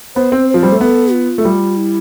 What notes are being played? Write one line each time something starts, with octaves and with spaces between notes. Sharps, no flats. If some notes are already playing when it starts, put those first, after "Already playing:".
B3 C5
C4
C5
F3
G3
A3
B3 A4
F4
A3
G3
E4